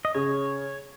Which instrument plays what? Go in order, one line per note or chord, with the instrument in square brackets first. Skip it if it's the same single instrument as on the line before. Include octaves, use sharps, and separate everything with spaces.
[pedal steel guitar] D#5
[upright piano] C#3 [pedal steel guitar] C#5